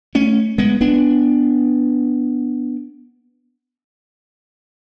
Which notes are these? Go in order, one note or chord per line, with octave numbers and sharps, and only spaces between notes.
A3 C#4
G#3 B3
B3 D4